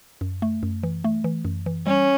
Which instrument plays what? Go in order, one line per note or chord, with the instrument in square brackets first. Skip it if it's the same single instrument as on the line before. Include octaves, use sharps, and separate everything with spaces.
[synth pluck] F#2
A3
F#2
E3
A3
E3
F#2
E3
[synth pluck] G3 [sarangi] C#4